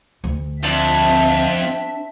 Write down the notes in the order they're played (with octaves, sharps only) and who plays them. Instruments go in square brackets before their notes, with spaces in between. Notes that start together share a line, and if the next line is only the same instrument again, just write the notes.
[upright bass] D2
[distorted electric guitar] F2 [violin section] C4 E5 B6 [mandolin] D4